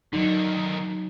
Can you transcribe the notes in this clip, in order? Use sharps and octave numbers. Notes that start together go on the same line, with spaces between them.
D3 D#3 F#3 D#4